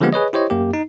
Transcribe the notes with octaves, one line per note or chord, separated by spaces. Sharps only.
D3 F3 G#3 A#3 B3 G4
G#4 B4 C#5 D#5
E4 G4 C5 C#5 D#5
F#2 A#3 G4
D#4